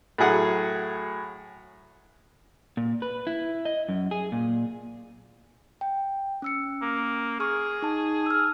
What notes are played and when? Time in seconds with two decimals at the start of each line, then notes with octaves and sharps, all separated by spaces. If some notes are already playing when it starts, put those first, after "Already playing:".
0.18 A2 F#3 G#4 F#5
2.77 A#2
3.02 B4
3.27 E4
3.65 D#5
3.89 F#2
4.11 G#4
4.32 A#2
5.81 G5
6.42 C#4 E6 C#7
6.82 A#3
7.40 G#4 C#6 F6
7.82 D#4 A5
8.26 E6 F6